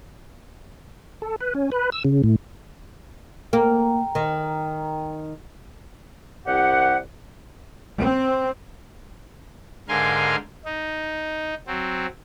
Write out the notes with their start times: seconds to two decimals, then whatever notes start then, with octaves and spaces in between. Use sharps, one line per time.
1.22 A4
1.41 B4
1.55 C#4
1.72 B4
1.92 E6
2.05 C#3
2.24 A2
3.53 A#3 G5 A#5
4.15 D#3
6.46 C2 G4 F#5
7.99 C4
9.88 G#2 D3 A#4 F5 G#5 C6
10.65 D#4
11.67 F#3 C4